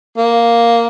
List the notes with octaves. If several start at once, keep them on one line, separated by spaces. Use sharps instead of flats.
A#3